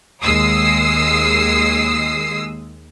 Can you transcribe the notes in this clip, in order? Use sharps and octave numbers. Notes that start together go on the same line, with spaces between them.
D#2 G#3 D#6 E6 C7